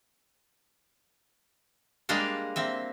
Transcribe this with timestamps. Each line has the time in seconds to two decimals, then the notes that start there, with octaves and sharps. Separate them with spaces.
2.09 G3 G#3 A#3 D4 F5
2.56 A#3 C4 E5